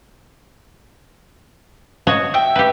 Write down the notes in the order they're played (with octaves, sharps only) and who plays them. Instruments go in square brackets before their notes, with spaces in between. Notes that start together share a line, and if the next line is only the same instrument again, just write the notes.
[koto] F#4 C#5 D#5
[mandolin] E5 G5
[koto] G4 B4